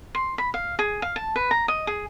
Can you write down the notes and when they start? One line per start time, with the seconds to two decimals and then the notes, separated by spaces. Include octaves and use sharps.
0.15 C6
0.38 B5
0.54 F5
0.79 G#4
1.02 F5
1.16 A5
1.36 B4
1.51 A#5
1.68 D#5
1.87 G#4